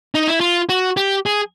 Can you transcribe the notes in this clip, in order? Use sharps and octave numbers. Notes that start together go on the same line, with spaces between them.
D#4
E4
F4
F#4
G4
G#4